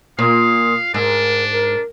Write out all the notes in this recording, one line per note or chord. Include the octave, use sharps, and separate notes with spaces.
A#2 F5 D#6
G#2 D4 A#4
A#4